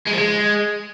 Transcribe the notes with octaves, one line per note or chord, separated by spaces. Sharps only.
G#3
F3
G#3